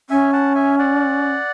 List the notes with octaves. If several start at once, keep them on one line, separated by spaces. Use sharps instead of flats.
C#4 E5 G#5
F#5 A5
E5 G#5
D5 F#5